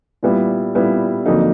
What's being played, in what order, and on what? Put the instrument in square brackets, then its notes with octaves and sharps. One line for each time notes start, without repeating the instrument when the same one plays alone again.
[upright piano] A#2 G3 B3 E4
A#2 G3 B3 E4
F2 D3 F#3 A#3 D#4